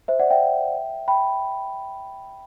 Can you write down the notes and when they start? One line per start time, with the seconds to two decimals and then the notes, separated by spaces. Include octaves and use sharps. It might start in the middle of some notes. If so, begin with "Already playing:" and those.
0.08 C5 E5
0.19 D5 F#5
0.30 E5 G5
1.08 G5 B5